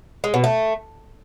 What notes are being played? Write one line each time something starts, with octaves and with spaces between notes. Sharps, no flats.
G#3
B2
A3